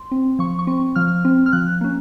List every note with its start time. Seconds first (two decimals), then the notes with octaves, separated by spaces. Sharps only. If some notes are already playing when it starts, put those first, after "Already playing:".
Already playing: C6
0.11 C4
0.39 F3 C#6
0.59 C#6
0.67 C4
0.96 F3 F6
1.25 C4
1.46 F6
1.52 F3 F#6
1.81 A#3 C#4